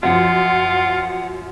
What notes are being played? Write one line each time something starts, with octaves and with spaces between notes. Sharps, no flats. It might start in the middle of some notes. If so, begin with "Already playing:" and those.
F#2 F3 F4 F#5